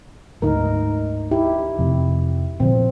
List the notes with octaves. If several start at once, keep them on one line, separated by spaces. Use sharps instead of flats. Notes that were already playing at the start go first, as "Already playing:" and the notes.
D2 G#2 D#4 A#4
E4 G4
F2 C3
A#2 D3 F3 C4